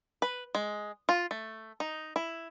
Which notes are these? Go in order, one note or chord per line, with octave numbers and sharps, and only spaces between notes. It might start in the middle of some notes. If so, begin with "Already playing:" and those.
B4
G#3
F4
A3
D#4
E4